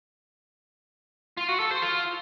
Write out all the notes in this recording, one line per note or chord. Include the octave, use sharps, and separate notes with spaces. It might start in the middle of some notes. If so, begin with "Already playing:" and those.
F4
F#4
A4
C5
F4